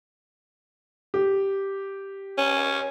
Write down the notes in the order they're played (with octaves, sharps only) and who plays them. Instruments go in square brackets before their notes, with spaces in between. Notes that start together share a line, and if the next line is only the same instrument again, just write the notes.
[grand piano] G4
[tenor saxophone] C#4